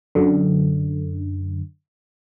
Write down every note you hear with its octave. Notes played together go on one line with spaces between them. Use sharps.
F#2 D3